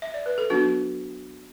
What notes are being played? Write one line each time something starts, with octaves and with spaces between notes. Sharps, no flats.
E5
D5
B4
A4
F#3 B3 D4 F#4